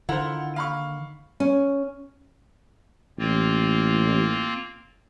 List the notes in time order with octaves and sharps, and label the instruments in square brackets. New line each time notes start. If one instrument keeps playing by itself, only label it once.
[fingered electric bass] D3 D#3 [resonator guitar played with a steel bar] E4 F#5 A#5 [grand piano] F4 A4 C5
[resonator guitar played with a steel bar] A#3 [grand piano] F5 B5 C#6
[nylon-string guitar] C#4
[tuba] A1 [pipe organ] A#3 C4 F4